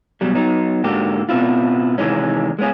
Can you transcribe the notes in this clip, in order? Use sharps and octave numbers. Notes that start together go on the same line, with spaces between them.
B2 F#3 G3
F#3 B3 D#4
G#2 D3 A#3 F#4 G4
B2 B3 C4 E4 F4
C3 D#3 E3 G#3 C#4
G#3 B3 C#4 G#4